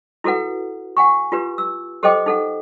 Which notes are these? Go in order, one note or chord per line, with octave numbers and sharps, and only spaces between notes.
E4 F#4 A4 B4 F#5
F#5 G#5 C#6
F4 G4 B4
E6
G4 A4 C5 D#5 G5 D6
D#4 A4 F#5